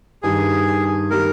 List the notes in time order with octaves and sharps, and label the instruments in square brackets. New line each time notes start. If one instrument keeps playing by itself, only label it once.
[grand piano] G2 D#3 G3 [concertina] G#4
[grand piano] D#3 G3 [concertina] A#4